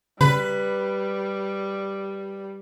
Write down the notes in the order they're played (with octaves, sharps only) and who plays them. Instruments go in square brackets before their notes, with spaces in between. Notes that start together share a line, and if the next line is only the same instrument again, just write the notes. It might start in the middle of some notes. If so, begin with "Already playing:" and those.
[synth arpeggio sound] C#3 [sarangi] G3 [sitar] B4